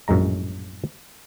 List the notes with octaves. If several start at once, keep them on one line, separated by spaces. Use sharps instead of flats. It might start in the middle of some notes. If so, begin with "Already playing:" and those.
A#1 F#2 A2 G#3 A#5